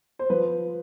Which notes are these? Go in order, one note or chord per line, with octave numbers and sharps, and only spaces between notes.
C5
F3 B4